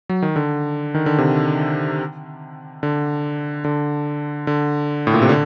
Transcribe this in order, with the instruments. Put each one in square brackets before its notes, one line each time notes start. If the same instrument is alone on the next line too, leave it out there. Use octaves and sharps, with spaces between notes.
[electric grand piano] F#3
D#3
D3
D#3
D3
C3
D3
D3
D3
A2
A#2
C3
D3